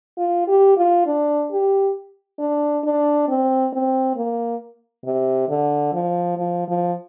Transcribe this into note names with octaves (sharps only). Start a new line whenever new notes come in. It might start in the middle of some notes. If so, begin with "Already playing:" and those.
F4
G4
F4
D4
G4
D4
D4
C4
C4
A#3
C3
D3
F3
F3
F3